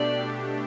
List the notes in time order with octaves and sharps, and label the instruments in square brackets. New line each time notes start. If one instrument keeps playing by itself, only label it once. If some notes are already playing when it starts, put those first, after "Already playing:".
Already playing: [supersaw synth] B2 A3 D4 G4 [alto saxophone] D5